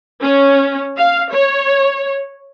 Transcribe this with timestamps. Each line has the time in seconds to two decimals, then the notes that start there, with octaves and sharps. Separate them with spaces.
0.23 C#4
0.98 F5
1.32 C#5